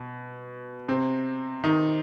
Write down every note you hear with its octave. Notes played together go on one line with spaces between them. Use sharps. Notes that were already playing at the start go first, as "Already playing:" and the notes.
Already playing: B2
C3 C4
D#3 D#4